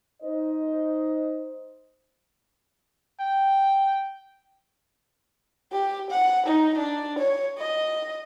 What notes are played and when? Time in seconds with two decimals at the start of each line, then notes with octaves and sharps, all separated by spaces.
0.22 D#4 C5 D#5
3.20 G5
5.73 G4
6.11 F#5
6.46 D#4
6.78 D4
7.19 C#5
7.59 D#5